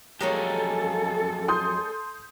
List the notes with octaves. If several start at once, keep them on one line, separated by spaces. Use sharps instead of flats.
F2 F#3 G#3 A#3 C#4 G4 A4
C6 D#6 G6